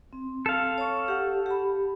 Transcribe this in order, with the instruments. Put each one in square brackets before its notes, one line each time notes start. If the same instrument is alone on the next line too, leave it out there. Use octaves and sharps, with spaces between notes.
[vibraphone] C4
[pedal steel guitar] A4 F5
[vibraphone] C#5 C#6
G4 F#5
G4 B5